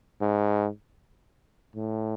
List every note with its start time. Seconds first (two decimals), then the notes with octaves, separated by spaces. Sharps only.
0.21 G#2
1.76 A2